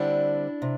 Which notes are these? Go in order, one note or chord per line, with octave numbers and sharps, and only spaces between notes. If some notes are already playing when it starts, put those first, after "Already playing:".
Already playing: D3 G3 C4 D4 E4
C3